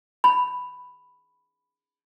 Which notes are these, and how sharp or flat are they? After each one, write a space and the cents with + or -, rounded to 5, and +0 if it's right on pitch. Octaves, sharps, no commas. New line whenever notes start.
B5 +0